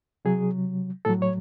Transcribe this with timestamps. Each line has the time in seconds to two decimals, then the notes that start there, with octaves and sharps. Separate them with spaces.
0.25 C3 F#3 G#4
1.05 A2 F#3 A4
1.22 C#5